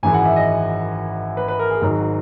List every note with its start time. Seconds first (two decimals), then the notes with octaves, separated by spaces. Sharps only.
0.03 G#1 F#2 E3 G#3 G#5
0.14 F#5
0.25 E5
0.36 D#5
1.37 B4
1.48 B4
1.59 A#4
1.70 G#4
1.82 G#1 G#2 F#3